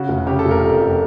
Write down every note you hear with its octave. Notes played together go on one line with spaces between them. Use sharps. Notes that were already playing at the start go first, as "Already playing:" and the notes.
Already playing: C#3 F#4
F1
C#3 G4
A4
F1
A#4
F2
F1